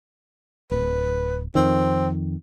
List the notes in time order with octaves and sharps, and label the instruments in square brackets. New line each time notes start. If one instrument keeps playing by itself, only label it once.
[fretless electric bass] D1 [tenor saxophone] B4
[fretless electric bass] F2 D#3 [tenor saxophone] C4